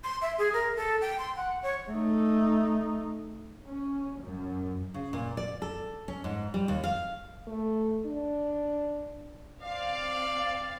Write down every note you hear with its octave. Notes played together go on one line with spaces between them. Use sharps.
C6
E5
G#4
A#4
A4
G5
C6
F#5
C#5
A3 D#4
C#4
F#2
C#3
A#2
D5
A4
C#4
G#2
G3
D#2
F5
A3
D4
C4 D5 F5